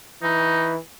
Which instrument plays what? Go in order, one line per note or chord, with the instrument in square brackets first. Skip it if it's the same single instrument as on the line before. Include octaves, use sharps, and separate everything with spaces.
[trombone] E3 [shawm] D#4